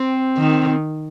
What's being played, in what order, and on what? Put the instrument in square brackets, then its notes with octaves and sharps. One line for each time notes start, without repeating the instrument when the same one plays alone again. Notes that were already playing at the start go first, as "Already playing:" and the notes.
Already playing: [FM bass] C4
[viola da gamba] D#3